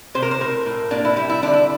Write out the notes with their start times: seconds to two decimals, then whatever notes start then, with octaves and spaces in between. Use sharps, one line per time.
0.15 C3 C5
0.22 A#4
0.31 C5
0.40 A2 A#4
0.66 A2
0.91 A#3 D4
1.05 E4
1.16 G3 E4
1.29 E4
1.42 D3 D4
1.54 E4